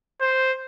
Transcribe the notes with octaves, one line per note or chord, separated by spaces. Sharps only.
C5